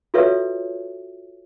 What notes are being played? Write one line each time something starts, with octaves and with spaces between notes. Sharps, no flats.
F4 F#4 A4 B4 C#5 E5